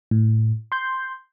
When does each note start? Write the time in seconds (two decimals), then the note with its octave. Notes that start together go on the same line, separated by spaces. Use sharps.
0.11 A2
0.72 C6 G6